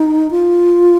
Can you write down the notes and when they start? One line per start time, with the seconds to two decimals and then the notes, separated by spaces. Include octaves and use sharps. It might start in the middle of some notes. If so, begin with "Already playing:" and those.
Already playing: D#4
0.31 F4